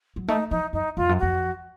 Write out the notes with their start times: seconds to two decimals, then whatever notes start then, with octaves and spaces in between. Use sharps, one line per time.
0.16 F#3
0.28 A3 D#4
0.50 F3 D#4
0.73 F#2 D#4
0.97 F2 F4
1.09 F#2
1.19 F2 F#4